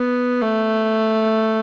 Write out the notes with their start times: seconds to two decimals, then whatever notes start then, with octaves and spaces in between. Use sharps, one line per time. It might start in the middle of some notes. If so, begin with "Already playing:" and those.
Already playing: B3
0.41 A3